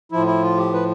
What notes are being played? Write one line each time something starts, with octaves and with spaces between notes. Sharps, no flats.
A2 F3 E4
E4
F4
G4
B4